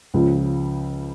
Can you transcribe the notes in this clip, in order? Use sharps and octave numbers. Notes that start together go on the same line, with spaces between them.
C#2 C#3 F3